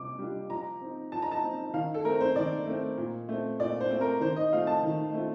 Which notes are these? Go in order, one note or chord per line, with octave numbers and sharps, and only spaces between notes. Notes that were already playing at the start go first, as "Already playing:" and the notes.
Already playing: C3 G3 F4 D6
G3 D4 F4
F3 A#5
C4 D#4
F3 A5
A#5
A5
C4 D#4
D#3 F5
A4
A3 C4 A#4
C5
D#3 D5
A3 C4
A#2
A3 C4
A#2 D5
C5
A3 C4
A#4
D#3 C5
D#5
A3 C4 F4 F5
A5
D#3
A3 C4 F4